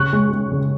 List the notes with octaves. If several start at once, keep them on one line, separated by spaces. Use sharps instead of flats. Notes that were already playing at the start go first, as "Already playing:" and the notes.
Already playing: C#3 C#6 F#6
G#3
G#3
C#3